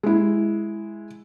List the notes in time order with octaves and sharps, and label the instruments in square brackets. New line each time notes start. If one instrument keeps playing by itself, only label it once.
[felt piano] G#3 E4